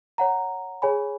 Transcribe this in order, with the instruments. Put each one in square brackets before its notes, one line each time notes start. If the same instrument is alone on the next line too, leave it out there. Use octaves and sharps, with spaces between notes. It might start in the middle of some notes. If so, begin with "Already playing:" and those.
[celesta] C#5 F#5 A#5
G#4 C#5 G#5 B5